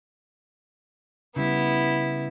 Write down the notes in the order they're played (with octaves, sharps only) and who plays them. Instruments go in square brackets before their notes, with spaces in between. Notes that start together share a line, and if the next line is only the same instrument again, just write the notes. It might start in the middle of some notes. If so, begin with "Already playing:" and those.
[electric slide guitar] C#3 G3 [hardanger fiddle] B3 E4